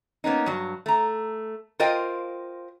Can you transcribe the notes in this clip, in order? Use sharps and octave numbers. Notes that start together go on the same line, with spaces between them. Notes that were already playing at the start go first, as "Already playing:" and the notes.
A#3 B3 C#4 D#4
G2 F#3
A3 A#5
F4 A#4 C5 D#5 F5 G5